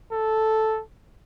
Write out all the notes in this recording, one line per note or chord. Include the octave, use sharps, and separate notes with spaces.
A4